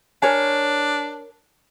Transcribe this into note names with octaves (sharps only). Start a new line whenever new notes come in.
D4 A#4 C#5 G#5